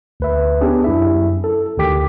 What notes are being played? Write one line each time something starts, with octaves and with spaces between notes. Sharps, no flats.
D2 B4 E5
B3 C#4 D4 G4 G#4
F#2 E4 E5
A4
D2 D#3 G4 G5 D6 B6